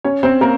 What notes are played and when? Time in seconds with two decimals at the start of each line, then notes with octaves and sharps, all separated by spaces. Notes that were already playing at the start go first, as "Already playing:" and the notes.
0.04 C#4 C#5
0.23 C4 C5
0.41 A#3 A#4